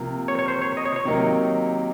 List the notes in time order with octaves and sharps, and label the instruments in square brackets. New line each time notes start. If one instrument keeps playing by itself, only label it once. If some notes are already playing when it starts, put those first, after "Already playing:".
Already playing: [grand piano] C3 F3 A#3
[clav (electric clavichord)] C#5
C#5
C5
C#5
D#5
C#5
C#5
[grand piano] C3 D#3 F#3 A#3 D#4